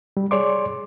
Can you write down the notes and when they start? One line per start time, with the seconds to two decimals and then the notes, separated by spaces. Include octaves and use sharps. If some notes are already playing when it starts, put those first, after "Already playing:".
0.17 G3
0.31 G#4 C#5 D5 C6 D6